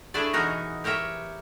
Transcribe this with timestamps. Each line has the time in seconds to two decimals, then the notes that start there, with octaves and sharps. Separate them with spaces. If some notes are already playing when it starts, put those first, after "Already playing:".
0.14 A3 D4 E4 G#4 D5
0.33 B2 E3 D#4 F#4 A#4
0.84 G4 A#4 C#5 E5 G5